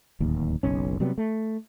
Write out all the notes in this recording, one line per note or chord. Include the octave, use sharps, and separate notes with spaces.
D1 D#2
F#1 B1 C#4
C3 F#3 G3 B3
A3